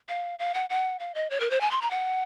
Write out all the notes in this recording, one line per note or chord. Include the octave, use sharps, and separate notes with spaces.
F5
F5
F#5
F#5
F5
D#5
C#5
A#4
C5
G#5
C6
A#5
F#5